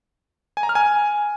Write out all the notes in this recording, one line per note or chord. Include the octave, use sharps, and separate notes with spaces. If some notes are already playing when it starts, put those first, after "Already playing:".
G#5
A#5
F6
G#5